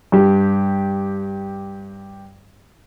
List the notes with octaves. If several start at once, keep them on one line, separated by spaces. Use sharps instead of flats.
G2 G4